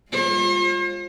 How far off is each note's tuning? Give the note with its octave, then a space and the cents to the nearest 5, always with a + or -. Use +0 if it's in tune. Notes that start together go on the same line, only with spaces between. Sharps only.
G#3 -45 F4 +15 C5 +45